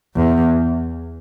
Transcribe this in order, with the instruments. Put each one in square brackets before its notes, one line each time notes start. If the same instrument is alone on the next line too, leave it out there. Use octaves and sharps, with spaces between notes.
[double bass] E2